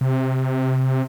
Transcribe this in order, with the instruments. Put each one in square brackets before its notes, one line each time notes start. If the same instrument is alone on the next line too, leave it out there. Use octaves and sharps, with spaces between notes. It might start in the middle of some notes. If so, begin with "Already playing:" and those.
[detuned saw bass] C3